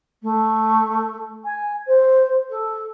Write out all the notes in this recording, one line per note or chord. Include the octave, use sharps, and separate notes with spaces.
A3
G#5
C5
A4